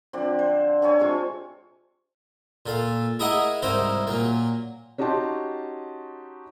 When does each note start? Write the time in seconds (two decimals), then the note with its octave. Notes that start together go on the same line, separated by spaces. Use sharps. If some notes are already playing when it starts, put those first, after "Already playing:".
0.13 D3 F3 C4 D5
0.39 C5
0.82 D3 A4 C#5 G#5
0.99 C3 G#3 F4 C#6
2.66 A#2 A4 F5
3.19 E4 G#4 A#4 D#5 E5 F#5
3.62 C2 G#2 D#4 E4 A#4 C5
4.07 A#2 F#3 A#3
4.98 C#4 D#4 F#4 G4 A5 C6